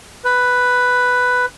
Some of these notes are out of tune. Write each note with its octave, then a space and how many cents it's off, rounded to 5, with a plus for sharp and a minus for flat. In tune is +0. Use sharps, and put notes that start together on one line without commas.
B4 +5